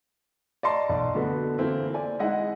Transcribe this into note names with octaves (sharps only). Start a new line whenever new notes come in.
D5 D#5 A5 A#5 C6 C#6
B1 D5
D3 B3 F#4 A4 B4
D3 E3 A#3 C4 E4
D5 G#5
G#3 D#4 E4 D#5 F#5